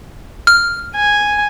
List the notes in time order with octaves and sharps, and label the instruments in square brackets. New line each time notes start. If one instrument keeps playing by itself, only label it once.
[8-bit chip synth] F6
[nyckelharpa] G#5